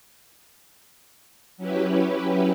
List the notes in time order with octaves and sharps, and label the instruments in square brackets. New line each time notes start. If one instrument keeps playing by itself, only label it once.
[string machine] F#3 C#4 E4 G4 B4